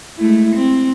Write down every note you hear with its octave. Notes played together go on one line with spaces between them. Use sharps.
G#3 A3 E4
C4